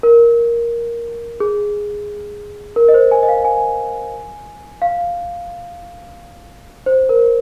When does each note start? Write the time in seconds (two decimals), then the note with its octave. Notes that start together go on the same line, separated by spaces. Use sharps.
0.03 A#4
1.40 G#4
2.76 A#4
2.88 D#5
2.94 C5
3.11 G#5
3.23 D#5
3.29 F5
3.45 G#5
4.82 F5
6.86 C5
7.09 A#4